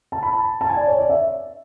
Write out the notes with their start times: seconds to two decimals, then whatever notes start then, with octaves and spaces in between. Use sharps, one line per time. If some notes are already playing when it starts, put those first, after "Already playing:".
0.12 A5
0.23 B5
0.33 A5
0.61 A5
0.69 G#5
0.77 D5
0.87 C#5
0.99 D5
1.09 E5